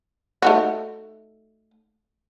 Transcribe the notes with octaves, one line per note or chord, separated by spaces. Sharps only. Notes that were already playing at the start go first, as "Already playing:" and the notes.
A3 D#4 F#4